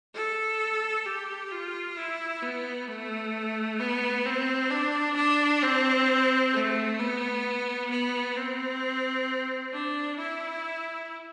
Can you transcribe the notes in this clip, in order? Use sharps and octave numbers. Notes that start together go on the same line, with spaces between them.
A4
G4
F4
E4
B3
A3
B3
C4
D4
D4
C4
A3
B3
B3
C4
D4
E4